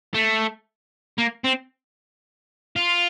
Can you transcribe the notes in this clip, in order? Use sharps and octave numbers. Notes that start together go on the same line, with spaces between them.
A3
A#3
C4
F4